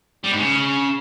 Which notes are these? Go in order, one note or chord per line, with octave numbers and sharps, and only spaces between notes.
G3
G#2
C#3